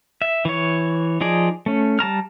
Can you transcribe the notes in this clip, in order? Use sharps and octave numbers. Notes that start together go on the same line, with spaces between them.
E5
E3 C#5
F3 D#4 G#4 D5
A3 C#4
G3 A5 A#5 F6